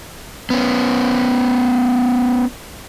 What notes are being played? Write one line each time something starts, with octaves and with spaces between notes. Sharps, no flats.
B3 C#4